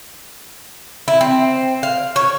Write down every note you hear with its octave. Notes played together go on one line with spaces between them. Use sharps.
E4
C4
F5
C#5